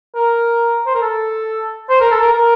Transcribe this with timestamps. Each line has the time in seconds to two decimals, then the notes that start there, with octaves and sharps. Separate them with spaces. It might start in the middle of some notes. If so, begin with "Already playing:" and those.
0.15 A#4
0.86 C5
0.94 A#4
1.01 A4
1.89 C5
2.01 A#4
2.11 A4
2.21 A#4
2.32 A#4